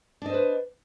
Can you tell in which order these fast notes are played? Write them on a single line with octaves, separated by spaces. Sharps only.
D4 D#5 C5 B4